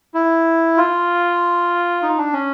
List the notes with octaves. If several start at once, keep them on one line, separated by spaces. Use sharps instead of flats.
E4
F4
D#4
D4
C#4